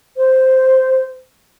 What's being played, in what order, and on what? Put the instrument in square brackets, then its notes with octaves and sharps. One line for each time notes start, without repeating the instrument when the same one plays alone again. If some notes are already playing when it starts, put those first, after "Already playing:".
[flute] C5